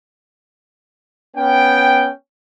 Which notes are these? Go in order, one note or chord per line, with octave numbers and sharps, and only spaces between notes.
B3 C#4 G5